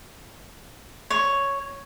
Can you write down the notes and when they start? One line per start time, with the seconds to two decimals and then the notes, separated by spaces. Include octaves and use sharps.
1.10 C#5